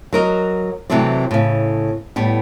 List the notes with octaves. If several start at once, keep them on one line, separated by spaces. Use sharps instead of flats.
F#3 A#4 D#5
C3 E3 F#3 A3 C4 D5
A2 C#3
A2 G3 B3